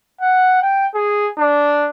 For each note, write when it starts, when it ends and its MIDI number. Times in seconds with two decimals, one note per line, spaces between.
0.21 0.58 78
0.62 0.86 79
0.94 1.29 68
1.38 1.89 62